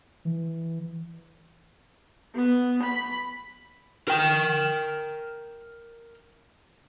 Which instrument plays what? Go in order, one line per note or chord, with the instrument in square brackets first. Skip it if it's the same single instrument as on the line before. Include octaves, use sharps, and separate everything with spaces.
[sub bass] E3
[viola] B3
B5
[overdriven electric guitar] A#4 G5